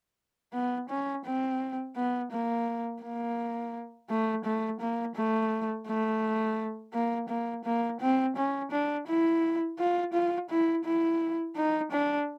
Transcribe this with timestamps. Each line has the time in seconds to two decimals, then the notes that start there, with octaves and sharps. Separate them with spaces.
0.53 B3
0.89 C#4
1.25 C4
1.96 B3
2.32 A#3
3.02 A#3
4.10 A3
4.45 A3
4.80 A#3
5.16 A3
5.87 A3
6.93 A#3
7.29 A#3
7.65 A#3
8.01 C4
8.37 C#4
8.72 D4
9.08 E4
9.79 F4
10.13 F4
10.50 E4
10.85 E4
11.56 D#4
11.91 D4